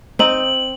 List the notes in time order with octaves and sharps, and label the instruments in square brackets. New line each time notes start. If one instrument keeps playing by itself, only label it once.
[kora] C4 D#4 [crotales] F#7